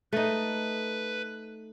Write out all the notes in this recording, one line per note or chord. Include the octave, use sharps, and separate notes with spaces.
A3 D#4 B4